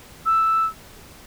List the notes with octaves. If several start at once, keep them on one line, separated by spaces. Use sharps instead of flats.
E6